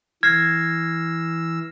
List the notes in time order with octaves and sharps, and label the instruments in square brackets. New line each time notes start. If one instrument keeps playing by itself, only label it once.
[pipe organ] E3 E6 [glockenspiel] F6 A#6 C7 [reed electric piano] G#6